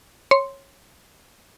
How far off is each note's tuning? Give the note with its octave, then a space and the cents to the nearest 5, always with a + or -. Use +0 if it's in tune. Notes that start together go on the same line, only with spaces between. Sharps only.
C#5 -15 C6 +0